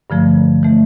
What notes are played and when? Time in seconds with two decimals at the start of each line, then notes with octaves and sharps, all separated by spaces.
0.10 G2 D3 F3 A3
0.63 E3 A3